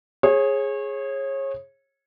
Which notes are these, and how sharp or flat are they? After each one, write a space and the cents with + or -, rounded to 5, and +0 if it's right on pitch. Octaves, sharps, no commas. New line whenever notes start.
G#4 +0 C#5 -30